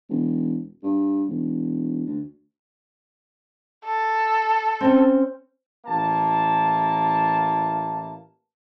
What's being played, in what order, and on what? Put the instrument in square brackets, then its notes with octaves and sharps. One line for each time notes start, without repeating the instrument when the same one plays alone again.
[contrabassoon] E1
G2
E1
D2
[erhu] A4
[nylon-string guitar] C4 C#4
[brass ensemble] A1 A#3 E4 A5